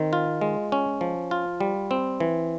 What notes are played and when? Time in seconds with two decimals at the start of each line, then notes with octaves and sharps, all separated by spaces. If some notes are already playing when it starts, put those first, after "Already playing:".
Already playing: D#3 C4
0.13 F4
0.41 G#3
0.72 C#4
1.01 F3
1.31 F4
1.60 G3
1.91 C4
2.20 E3